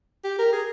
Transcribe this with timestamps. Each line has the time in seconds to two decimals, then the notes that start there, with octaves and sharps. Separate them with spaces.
0.24 G4
0.39 A#4
0.52 G#4